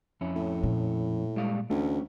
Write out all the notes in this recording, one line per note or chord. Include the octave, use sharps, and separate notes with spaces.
F2 C#4 E4
A2
A#2
G3 G#3 F5
D2 A3 C#4